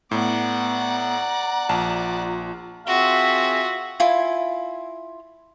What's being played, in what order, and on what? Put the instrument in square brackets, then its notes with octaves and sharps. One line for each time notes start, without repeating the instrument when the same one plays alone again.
[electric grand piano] A2 [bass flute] B3 [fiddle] D5 F#5 [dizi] A#5
[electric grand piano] A#1 A5 [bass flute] F4
[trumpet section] C4 G#4 E5 [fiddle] F4 F#4
[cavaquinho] E4 F4 G#5